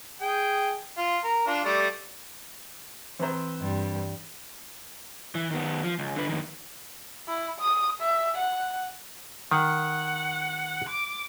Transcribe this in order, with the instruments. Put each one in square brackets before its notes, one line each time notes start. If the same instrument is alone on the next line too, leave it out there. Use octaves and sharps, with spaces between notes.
[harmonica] G#4 G5
F4
A#4
D4 F4
G3 A3 D5
[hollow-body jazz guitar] E3 A#5 [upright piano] C4 B4 C5
[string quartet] G2 G3
[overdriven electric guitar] E3
D#3 B3
F3
C#2
D3 B4
F2 D#3
[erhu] E4
D#6
E5
F#5
[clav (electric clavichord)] D#3 [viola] F#5
[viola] D6